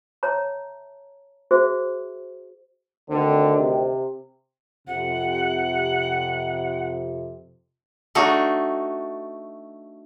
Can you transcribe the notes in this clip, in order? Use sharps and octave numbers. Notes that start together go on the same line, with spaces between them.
C#5 E5 A5 A#5
F#4 G#4 C5 E5
D2 D3 D#3 C4
C3
F2 C3 F#5
A3 D4 D#4 F#4